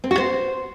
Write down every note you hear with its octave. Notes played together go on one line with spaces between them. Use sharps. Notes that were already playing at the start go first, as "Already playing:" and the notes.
C4
F#4
C5